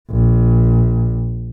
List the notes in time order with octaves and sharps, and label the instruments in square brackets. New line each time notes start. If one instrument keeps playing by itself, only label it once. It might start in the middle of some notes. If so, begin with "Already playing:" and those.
[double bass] A#1